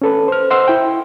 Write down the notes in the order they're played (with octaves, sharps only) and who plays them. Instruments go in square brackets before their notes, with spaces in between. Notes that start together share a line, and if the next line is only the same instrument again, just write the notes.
[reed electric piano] C#4 A4 B4
C5 F6
C5 D#5 F#5 C6 E6
E4 G5